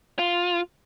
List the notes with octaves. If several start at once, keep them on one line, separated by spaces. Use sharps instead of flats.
F4